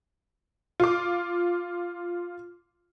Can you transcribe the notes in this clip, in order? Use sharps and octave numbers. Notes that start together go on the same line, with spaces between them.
F4 D6